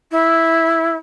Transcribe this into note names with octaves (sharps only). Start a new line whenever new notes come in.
E4